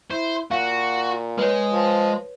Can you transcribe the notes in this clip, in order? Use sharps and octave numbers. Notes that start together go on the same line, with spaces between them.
E4 C5
A#2 F#4 F5
G#3 B4 C#5
F3